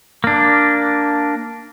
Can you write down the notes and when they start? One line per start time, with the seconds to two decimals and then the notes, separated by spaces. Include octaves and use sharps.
0.24 A#3 D4